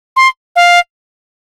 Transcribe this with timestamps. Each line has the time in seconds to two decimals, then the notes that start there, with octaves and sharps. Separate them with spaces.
0.16 C6
0.56 F5